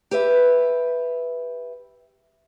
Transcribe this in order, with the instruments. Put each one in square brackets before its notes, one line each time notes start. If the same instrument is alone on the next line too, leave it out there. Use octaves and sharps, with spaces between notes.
[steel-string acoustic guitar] G4 B4 E5